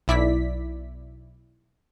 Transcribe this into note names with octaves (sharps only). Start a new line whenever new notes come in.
B1 E4 D5 B6